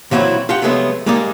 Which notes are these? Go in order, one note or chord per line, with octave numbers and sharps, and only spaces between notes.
A#2 E3 F#3 C4 E4 F#4
F4 G4 F#5
C3 F3 F#3 G#3 A3 B3
G3 G#3 A#3 D#4 G#4 D5